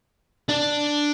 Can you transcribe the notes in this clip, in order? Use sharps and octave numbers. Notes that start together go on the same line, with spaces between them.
D4